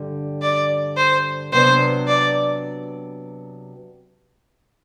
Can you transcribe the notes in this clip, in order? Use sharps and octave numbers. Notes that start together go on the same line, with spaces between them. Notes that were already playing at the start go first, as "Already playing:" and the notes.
Already playing: G2 D3 G3
D5
C5
C3 F#3 B3 D4 C5
D5